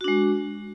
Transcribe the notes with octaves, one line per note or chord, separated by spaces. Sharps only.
G#3 D4 F#4